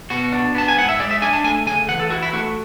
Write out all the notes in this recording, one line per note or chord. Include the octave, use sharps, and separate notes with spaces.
B2 F#4
D4
B3 A5
G#5
G#2 F#5
E5
G#3 D5
E5
D4 G#5
A5
A3 G#5
C#3 G#5
E3 F#5
A4
E4 F#4
E4
A3 F#4